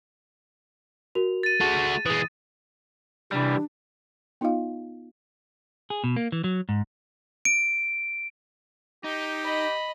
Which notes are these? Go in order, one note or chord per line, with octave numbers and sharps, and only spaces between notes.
F#4 A#4 F7
A6 D#7
A3 F#4 G#4 A5
E3 G#3 D#6
C3 E3 G3 D4
B3 D#4 F4 D#5 F5
G#4
B2
A#3
E3
F#3
G#2
D7
D#4 G4
D#5 B5